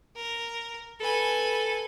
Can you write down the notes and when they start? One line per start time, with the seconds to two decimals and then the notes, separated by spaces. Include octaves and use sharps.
0.16 A#4
1.00 A4 B4 G#5